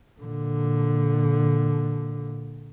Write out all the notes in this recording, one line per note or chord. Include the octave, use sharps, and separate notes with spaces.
A#2 D3